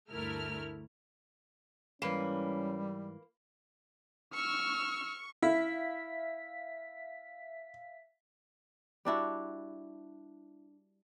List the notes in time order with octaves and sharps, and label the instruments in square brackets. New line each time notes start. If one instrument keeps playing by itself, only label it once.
[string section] D2 G2 A3 E4 A#4 F6
[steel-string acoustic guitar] G#2 E3 [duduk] G3 [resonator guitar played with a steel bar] A#3 B4 [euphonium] C#4
[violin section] C#6 [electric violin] E6 F6
[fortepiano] E4 [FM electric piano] E5 F5 B6
[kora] G3 D4 E4 F#4